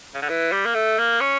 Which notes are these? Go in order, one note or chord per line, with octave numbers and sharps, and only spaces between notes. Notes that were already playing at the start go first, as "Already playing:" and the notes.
C#3
D3
E3
G3
A#3
A3
A#3
C#4